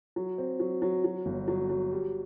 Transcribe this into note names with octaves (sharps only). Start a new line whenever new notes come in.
F#3
C4
F#3
F#3
F#3
G1
F#3
F#3
G3